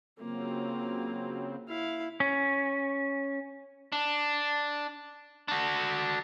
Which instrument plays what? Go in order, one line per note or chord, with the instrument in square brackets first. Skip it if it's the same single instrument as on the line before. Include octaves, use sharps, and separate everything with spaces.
[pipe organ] C#3 F#3 C4 [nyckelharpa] A#3 F4
[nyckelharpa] E4 F5
[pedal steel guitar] C#4
[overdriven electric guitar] D4
D4 F#4